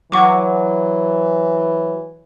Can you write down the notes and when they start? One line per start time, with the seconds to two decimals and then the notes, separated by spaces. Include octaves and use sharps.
0.12 E3 F#3 F#5 C#6 D6